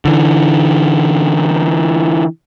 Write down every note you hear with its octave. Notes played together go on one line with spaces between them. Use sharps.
D3 E3